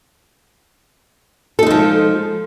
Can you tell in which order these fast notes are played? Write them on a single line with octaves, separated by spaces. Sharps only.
A4 D#4 G#3 F3